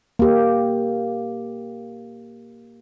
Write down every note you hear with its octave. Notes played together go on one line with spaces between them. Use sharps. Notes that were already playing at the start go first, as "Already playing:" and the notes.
A#3 G4